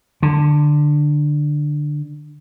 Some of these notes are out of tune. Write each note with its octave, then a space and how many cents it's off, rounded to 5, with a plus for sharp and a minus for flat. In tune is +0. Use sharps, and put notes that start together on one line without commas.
D3 +15